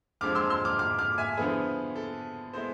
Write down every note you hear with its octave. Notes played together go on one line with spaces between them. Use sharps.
F2 D3 F3 G#3 D6 F6
C6 E6
C6 E6
D6 F6
D6 F6
D6 F6
E5 G#5
D3 F3 B3 E4 G#4 B4
A4
G#3 B3 E4 A4 C5